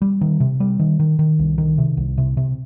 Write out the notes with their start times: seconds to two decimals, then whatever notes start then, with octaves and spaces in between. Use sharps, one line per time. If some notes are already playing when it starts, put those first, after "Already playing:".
0.02 G3
0.21 D#3
0.40 C3
0.60 G3
0.80 D#3
1.00 D#3
1.19 D#3
1.39 C2
1.58 D#3
1.78 C3
1.97 C2
2.18 C3
2.37 C3